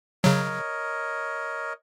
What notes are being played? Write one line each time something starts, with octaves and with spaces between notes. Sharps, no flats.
C#3 F#3 A#4 C#5 D#5